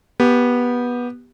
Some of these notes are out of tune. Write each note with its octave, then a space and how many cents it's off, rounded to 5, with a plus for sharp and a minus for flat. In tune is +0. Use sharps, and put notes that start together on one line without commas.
B3 -15 G4 +0